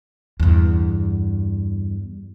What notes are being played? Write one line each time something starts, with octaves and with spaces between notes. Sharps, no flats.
E2 G2